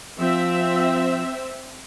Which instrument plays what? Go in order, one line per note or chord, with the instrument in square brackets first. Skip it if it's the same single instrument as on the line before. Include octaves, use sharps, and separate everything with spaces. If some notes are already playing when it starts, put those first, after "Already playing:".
[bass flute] F3 [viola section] C4 E5